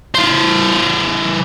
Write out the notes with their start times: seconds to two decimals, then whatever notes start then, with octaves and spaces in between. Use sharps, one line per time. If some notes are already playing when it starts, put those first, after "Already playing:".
0.14 E3 C5